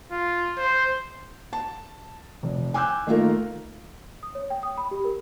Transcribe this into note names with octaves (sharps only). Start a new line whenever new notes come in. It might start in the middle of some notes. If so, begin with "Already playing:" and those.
F4
C5
A5
F1
G#5 D6 E6 F#6 G6
D#3 A3 A#3 F4 A#4
D#6
C#5
G5
D#6
B5
G4
A#4